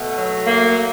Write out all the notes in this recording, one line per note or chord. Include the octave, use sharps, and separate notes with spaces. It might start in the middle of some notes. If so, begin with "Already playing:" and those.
Already playing: B2 A3
F#3
A3 A#3